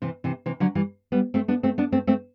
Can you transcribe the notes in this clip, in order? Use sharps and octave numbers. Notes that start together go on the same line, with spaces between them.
C3 E3
C3 E3
C3 E3
D3 F#3
E3 G3
G3 B3
A3 C4
B3 D4
A3 C4
B3 D4
A3 C4
A3 C4